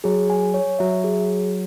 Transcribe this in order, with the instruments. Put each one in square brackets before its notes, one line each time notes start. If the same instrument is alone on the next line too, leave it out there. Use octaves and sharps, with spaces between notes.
[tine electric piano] F#3 [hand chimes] G#4
[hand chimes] G#5
C#5
[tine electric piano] F#3 [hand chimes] E5
[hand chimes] G#4